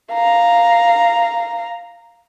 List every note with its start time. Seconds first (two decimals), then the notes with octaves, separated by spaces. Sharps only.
0.13 F5 A#5